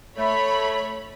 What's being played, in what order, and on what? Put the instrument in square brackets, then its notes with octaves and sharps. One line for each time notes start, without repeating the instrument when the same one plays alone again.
[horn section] A3 [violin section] C#5 B5